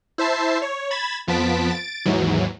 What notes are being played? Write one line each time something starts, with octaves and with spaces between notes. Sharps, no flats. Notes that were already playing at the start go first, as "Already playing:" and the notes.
E4 C5 E5 A5 C7
C#5
B5 G#6 A6 E7
F2 F3 B3 A5 B6 D7
A6 D7
D#2 G#2 E3 F#3